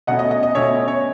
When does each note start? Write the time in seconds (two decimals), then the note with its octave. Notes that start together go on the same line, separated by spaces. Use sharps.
0.07 B2 A3 C#4 D#5 F#5
0.19 D#5
0.31 D#5
0.43 D#5
0.55 B2 A3 C#4 C#5 E5
0.88 C#5